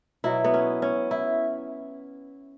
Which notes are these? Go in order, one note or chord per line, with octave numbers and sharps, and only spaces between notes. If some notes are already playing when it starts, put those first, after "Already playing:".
B2 F#3 E4
B3
C#4
C#4
E4